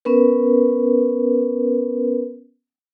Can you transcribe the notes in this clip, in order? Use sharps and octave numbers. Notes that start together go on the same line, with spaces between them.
B3 C#4 A#4 B4